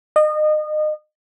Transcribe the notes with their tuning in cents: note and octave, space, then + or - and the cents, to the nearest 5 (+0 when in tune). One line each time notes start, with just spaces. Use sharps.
D#5 -30